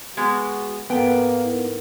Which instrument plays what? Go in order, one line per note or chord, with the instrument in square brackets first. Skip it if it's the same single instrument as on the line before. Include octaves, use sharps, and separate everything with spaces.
[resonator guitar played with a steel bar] G#3 B3 [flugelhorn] F#4
[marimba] G#2 A4 A5 [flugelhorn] A#3 [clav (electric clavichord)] B3 [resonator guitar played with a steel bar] G5
[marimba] D#4 E4 A#4